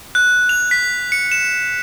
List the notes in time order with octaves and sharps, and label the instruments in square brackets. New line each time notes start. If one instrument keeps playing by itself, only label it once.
[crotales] F#6
F7
B6
C#7
E7